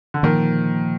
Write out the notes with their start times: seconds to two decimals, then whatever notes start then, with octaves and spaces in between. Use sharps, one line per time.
0.14 D3
0.23 A#2 D#3 F3 A#3